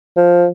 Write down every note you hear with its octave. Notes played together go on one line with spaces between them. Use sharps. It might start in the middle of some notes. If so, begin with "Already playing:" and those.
F3